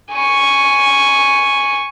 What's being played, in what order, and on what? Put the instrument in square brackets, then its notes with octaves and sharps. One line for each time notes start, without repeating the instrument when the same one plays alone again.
[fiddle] G#5 C#6